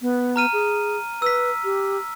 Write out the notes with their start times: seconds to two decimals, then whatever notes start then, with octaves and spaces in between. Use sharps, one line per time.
0.01 B3
0.36 A#5 F6 D#7
0.53 G#4
1.22 B4 E6 B6
1.64 G4